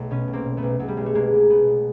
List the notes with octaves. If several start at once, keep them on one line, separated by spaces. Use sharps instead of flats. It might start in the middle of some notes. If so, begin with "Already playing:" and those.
Already playing: B1 A3
B2 B3 C#4
B1
A#3 C4
B2
A3 B3
B1
B1 F#3
G3
B1 G#3
A3
B2 G#3 A#3
B1
B2 A3 B3
B1